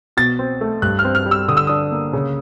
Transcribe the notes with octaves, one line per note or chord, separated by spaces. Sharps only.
B2 A6
C4
A3
G2 F#6
F6
C4
F6
G3
E6
D3 D#6
E6
D4 D#6
A#3
C#3